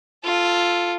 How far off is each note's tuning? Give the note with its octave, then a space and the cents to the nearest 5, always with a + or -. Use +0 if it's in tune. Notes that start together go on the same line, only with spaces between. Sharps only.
F4 +0 A4 +0